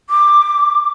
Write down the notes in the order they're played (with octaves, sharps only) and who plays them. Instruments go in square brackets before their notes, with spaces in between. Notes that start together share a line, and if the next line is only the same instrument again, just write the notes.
[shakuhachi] D6